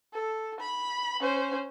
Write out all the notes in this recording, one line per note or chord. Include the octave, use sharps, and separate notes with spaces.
A4
B5
C#4 C5